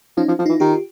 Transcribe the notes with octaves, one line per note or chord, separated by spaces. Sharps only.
F3 C#4 D#4
F3
F3
E3 D#4 F4
D#3 F4 G4